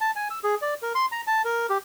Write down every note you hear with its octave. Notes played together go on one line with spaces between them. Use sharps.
A5
G#5
E6
G#4
D5
A#4
C6
A#5
A5
A#4
G4